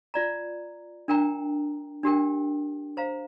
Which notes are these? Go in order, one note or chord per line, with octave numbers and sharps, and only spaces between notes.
F4 D5 A#5
D4 A#4 G5 A#5
D4 G4 A#4 G5
C5 F5 A#5